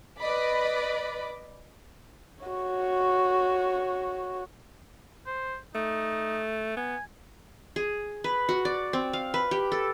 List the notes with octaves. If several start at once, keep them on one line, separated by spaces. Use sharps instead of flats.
B4 D5 D#5 B5 D6
F#4 C#5
C5
A3 D#4
B3 G#5
G#4
B4
F#4
D5
C4
F5
B4
G4
A4